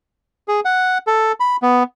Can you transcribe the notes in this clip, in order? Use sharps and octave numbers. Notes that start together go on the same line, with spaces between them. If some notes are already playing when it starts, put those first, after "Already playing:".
G#4
F#5
A4
B5
B3